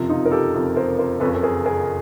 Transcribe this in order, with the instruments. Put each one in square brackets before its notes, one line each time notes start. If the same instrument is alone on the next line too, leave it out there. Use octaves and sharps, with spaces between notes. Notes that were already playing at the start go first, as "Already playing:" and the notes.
Already playing: [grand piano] F#1 F2 C3 F3
[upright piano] D#4 F4
A#4
G4 A4
[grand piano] F#1 F2 C3 F3
[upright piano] A#4 C5
A#4 C5
[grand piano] F#1 F2 C#3 [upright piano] A4 B4
[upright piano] A4
G#4 A#4
G#4 A#4